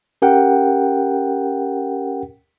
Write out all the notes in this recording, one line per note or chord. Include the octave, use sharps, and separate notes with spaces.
C#4 G4 A#4 F#5 G5